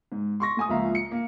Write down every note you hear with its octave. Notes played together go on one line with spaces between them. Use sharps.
G#2
C6 C#6 A#6
A3 G#5 D#6
C#2 F3 A#3 E5 F5 A#5
C#7
A#3